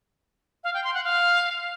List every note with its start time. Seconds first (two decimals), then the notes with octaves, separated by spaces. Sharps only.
0.64 F5
0.74 G5
0.84 C6
0.94 F#5
1.04 F5